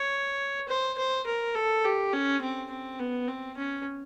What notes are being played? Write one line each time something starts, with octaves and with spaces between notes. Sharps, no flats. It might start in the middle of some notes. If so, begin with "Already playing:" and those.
Already playing: C#5
C5
C5
A#4
A4
G4
C#4
C4
C4
B3
C4
C#4